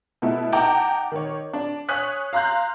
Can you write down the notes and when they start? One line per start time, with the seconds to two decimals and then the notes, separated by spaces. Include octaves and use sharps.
0.22 B2 A3 E4 A4
0.52 D#4 F#5 G5 A5 A#5 D6
1.12 D#3 C#5
1.53 D4
1.89 C#5 G#5 D#6 F#6 B6
2.33 F5 A#5 C6 F#6 G6